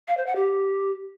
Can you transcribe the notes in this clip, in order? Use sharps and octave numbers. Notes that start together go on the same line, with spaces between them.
F5
C5
F#5
G4